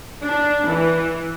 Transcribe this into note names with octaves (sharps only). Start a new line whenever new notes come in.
D4
E3